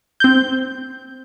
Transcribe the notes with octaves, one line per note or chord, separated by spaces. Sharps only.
C4 G6